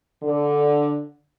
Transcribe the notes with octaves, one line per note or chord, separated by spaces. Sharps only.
D3